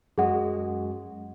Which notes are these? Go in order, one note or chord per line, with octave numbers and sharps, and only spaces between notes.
F#2 G#3 F#4 G#4 F#5